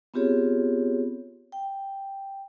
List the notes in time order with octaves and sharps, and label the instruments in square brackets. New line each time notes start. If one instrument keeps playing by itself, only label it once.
[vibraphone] B3 C4 F4 G4 G#4 C#5
G5